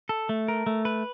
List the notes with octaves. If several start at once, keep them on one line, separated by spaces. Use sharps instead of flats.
A4
A3
A#4
A3
B4